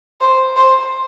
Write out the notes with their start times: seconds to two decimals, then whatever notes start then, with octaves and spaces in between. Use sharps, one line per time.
0.21 C5
0.56 C5